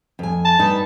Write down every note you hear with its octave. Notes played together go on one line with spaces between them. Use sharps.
F2 G#5
A5
G2 D#4 B4